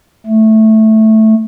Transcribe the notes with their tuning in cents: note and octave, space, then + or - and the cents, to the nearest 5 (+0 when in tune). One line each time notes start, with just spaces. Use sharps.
A3 -5